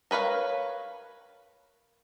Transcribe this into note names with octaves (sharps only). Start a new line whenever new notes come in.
A#4 B4 C#5 F5